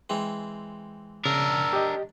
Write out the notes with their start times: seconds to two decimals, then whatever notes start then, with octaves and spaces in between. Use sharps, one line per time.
0.10 E3 G#3 C4
1.25 C#3 D4 A#4 E6
1.73 G4 D#5